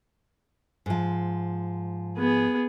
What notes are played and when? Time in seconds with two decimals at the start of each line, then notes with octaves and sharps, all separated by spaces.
0.86 G#2 F3
2.17 B3 G#4